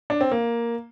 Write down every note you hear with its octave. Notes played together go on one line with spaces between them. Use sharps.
D4
C4
A#3